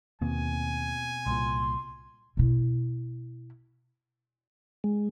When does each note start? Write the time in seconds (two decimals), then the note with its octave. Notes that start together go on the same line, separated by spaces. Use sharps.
0.22 D#2 B2 A#3 C4 G#5
1.26 C2 A#2 C6
2.37 B2 E4
4.84 G#3